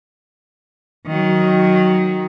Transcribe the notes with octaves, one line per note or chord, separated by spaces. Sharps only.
D#3 F#3